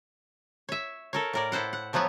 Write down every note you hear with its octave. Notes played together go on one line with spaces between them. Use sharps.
C#5 E5
A4 A#4 C#5
A2 A#4 D5
E4 A4 C5 F#5
F#5
A2 F3 F#3 B3 C#5